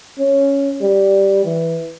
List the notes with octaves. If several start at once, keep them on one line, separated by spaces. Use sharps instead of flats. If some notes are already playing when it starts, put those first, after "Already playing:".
C#4
G3
E3